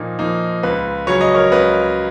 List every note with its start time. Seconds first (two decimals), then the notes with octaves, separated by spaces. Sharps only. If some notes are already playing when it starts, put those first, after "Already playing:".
Already playing: A#2 F3 A#3 D#4
0.19 F3 A#3 D#4
0.63 C#2 B4
1.07 C#3 F#3 C#4 C#5
1.21 D#5
1.35 A#4 C#5
1.52 C#2 B4 D#5